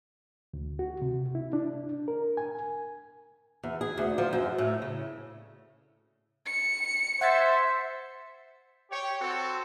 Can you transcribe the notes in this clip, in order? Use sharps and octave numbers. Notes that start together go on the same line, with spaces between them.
D2
F#4
C3
E4
D4
A#4
G#5
E2
G#4
D2
F3
F#2
A2
C#3
C#7
C5 E5 F#5 G#6 A6
G4 C#5
C4 F#4 A4